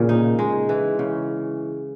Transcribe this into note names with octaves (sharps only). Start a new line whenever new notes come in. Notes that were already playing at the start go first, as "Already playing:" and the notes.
Already playing: A#2 C#3
D#4
G#3
E3
C#3